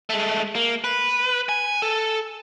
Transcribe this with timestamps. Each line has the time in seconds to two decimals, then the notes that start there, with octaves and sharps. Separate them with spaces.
0.10 G#3 A3
0.55 A#3
0.84 B4
1.49 G#5
1.82 A4